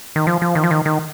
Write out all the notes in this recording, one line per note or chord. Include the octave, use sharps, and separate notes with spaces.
D#3
F3
F3
D#3
F3
D#3
D#3